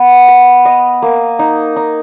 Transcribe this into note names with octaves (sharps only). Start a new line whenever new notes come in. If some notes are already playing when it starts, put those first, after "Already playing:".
Already playing: B3
B4
D#5
A#3
D#4
D#4